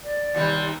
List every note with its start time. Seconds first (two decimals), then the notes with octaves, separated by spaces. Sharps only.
0.03 D5
0.34 D#2 C3 G3